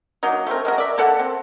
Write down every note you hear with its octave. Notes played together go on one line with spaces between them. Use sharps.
F#3 A#3 D#4
A3 C4 A#4
G#3 F#4 A#4
D5 E5
A#3 A4 F#5 A5
C4